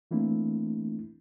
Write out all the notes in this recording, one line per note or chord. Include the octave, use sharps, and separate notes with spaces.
E3 A3 A#3 C4 D4 E4